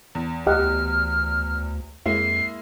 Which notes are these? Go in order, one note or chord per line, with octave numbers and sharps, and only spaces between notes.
E2
D2 G4 D#5 F#5 F6
F2 G#3 A#3 E4 C7